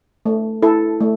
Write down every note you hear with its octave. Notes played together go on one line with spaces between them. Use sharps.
A3
E4 A4
A3